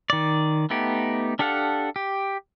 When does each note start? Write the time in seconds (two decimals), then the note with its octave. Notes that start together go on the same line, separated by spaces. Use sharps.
0.10 D#3 D5
0.70 A3 B3 D#4 G4
1.39 D4 G4 A4 F5 F#5
1.96 G4